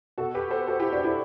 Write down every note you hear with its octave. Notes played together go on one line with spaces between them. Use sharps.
B2 F#4 A4
G4 B4
A4 C5
F#4 A4
E4 G4
D4 F#4
E4 G4